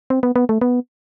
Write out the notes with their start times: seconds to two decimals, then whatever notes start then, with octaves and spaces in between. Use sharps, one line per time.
0.10 C4
0.23 B3
0.36 B3
0.49 A3
0.61 B3